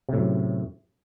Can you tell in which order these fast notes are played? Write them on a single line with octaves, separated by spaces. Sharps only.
C3 A2 F#2